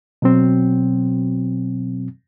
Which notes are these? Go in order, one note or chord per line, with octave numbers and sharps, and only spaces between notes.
B2 F#3 C4